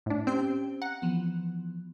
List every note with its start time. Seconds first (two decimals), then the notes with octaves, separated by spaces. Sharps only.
0.06 A2 D4
0.27 C4 C#4 G4 C5
0.82 F#5 A#5
1.02 E3 F3 B3